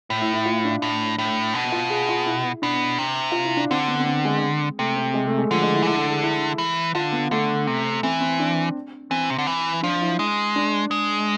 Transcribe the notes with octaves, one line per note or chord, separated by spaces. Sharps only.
A2
E4
E4
F4
D4
A2
A2
B2
F4
G#4
F4
E4
B2 D4
C3
F4
E4
D4
D3 C4
B3
C4
B3
G#3
C3 A3
C4
G#3
A3
G#3
D3 F3
G#3
E4
E3
D3 E4
A4
G#4
E4
E3
D3 F4
B3
D3 A3
C3
E3 C4
C4
D4
E3 C4
C3
D3
E3
F3 D4
E4
G#3
D4
G#3